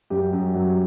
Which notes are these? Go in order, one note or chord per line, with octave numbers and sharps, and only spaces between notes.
F#2 G4
F#2
F#3